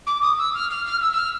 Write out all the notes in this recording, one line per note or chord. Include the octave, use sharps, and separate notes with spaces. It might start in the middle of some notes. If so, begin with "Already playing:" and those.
D6
D#6
E6
F6
F6
F6
E6
E6
F6